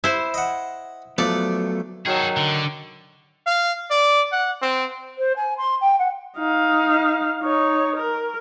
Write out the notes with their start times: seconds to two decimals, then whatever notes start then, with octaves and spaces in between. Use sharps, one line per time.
0.04 E4 C5
0.34 D#5 F#5
1.18 F3 F#3 A3 B3 A4 D5
2.06 D#3 F#3 G#4 A4
2.37 D3
3.46 F5
3.91 D5
4.32 F#5
4.62 C4
5.18 C5
5.36 G#5
5.57 C6
5.81 G5
5.99 F#5
6.37 D#4 F5
7.41 D#4 C#5
7.97 A#4